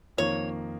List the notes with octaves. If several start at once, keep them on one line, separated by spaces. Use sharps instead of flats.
F2 D#3 A#3 C#5